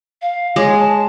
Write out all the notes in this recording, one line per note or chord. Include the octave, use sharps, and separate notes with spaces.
F5
G#3 C#5
A5